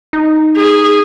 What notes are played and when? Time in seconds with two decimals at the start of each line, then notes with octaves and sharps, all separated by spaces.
0.13 D#4
0.57 G#4